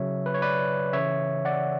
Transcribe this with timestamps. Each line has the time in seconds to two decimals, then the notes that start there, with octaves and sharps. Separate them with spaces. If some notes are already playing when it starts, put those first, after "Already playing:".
Already playing: C#3 F#3 C#5 E5
0.26 B4
0.34 C#5
0.42 B4 D5
0.93 C#3 E3 C#5 E5
1.45 D5 F#5